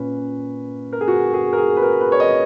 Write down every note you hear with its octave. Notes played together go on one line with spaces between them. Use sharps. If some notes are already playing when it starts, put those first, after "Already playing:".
Already playing: A#2 A#3 C#4 B4
A#4
G#4
F#4
G#4
A#4
G#4
B4
A#4
B4
C#5
D#5